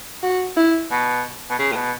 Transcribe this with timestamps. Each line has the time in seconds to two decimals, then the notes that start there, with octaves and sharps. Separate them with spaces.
0.23 F#4
0.57 E4
0.91 B2
1.50 B2
1.59 C#3
1.72 A2
1.76 B2